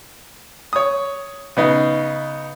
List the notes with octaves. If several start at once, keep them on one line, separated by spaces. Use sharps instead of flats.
C#5 D#6
C#3 B3 D#4